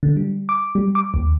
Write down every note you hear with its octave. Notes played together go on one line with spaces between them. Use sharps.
D3
G3
D6
G3
D6
D#2